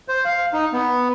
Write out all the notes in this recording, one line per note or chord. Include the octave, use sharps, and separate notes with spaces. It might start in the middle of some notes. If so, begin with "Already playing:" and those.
C5
F5
D#4
B3